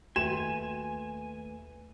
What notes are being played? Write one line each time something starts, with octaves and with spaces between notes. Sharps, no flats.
D#2 A3 F#4 B4 G5 G#5 E7